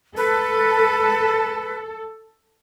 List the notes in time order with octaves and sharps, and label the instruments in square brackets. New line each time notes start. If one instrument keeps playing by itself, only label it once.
[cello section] A4 [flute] B4